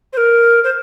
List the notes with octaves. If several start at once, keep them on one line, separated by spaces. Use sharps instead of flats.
C5
A#4
C5